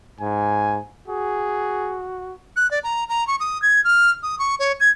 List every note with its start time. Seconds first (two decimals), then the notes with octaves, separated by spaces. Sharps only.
0.20 G#2 G#5
1.08 F#4 G#4
2.56 F#6
2.71 D5
2.84 A#5
3.09 A#5
3.27 C#6
3.40 D#6
3.62 G#6
3.84 F6
4.23 D#6
4.39 C#6
4.60 C#5
4.80 G#6